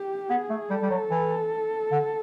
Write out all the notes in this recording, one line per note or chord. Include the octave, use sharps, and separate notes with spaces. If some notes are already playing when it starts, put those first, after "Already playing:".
Already playing: G4
B3 G#4
A3
G3 A4
G3
F#3
E3
D3